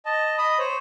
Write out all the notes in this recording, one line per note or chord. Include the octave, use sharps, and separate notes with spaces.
D#5 A5
D#5 B5 D#6
C5 C#5